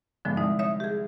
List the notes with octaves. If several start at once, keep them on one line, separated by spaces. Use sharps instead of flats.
G1 D3 F3 G#3
C2 G#3 D#4
C#5 E5 D#6
G4 G#4